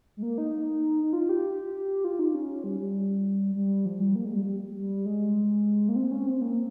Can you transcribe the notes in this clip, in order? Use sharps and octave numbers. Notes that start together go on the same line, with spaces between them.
G#3
A#3
D#4
D#4
F4
G4
F4
D#4
C#4
G3
G3
G3
F3
G3
A#3
G#3
G3
G3
G3
G#3
A#3
C4
C#4
C4
A#3